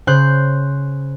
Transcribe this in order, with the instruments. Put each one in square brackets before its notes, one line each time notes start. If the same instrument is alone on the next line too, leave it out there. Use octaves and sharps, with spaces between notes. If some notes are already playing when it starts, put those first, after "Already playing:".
[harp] C#3 C5 F#6 G6